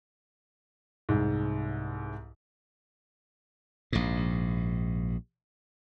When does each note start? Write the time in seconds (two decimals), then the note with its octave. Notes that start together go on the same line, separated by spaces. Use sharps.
1.09 C2 G#2
3.93 A#1 G#2